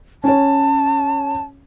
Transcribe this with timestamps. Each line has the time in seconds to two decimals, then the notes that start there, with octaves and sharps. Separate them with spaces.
0.24 C#4 C#5 A5